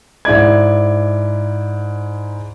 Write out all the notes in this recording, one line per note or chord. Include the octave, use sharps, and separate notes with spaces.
G#2 E4 D5 G#6